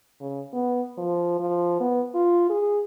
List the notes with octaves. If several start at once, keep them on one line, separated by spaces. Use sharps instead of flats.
C#3
B3
F3
F3
B3
F4
G#4